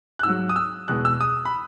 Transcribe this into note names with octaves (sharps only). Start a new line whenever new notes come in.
F#6
G#2 F#3 E6
D#6
E6
E2 B2 G#3 F#6
E6
D#6
B5